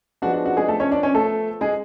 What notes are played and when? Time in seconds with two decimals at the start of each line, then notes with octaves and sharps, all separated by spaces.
0.22 F3 G#3 B3 D4 F#4
0.34 F#4
0.46 F#4
0.57 G#3 G#4
0.68 A3 A4
0.80 C#4 C#5
0.91 D4 D5
1.03 C#4 C#5
1.15 A3 A4
1.61 G#3 G#4